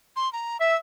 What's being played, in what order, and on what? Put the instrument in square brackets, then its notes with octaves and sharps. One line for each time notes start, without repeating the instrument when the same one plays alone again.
[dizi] C6
A#5
[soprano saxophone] E5 [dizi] E6